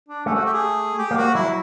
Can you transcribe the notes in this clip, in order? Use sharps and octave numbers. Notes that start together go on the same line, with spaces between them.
D4
A3 C#4
F#4
G4
G#4
G4
A#3
F#4
F#3 E4